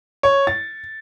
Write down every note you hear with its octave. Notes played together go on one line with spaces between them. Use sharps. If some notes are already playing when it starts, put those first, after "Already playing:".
C#5
A6